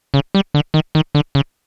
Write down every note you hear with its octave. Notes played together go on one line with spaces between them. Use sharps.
C#3
G3
D3
D#3
D#3
D3
C#3